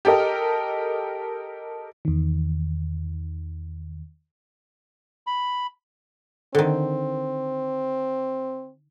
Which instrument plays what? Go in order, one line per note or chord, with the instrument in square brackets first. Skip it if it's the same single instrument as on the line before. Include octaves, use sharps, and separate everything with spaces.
[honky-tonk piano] G4 A4 A#4 D#5
[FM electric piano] E2 D#3
[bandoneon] B5
[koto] D3 D#3 [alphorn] C4